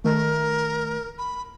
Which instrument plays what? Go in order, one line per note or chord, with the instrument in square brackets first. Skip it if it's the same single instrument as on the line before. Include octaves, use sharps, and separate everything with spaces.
[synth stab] D#3 A3 [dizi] A#4
[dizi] B5